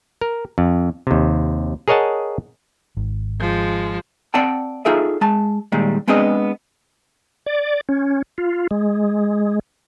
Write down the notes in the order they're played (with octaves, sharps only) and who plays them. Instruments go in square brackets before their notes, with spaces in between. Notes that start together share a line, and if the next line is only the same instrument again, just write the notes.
[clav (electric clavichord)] A#4
F2
D#2 C3
G#4 A#4 C#5 D#5 F#5 A5
[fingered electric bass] G#1
[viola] F3 G#3
[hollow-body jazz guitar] C4 D5 F#5 G5 A5
D#4 F4 G#4 A4 E5
G#3 A5
A#2 D#3 G3 G#3
G#3 B3 C4 D4 G#4 D#5
[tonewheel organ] D5
C#4
F4
G#3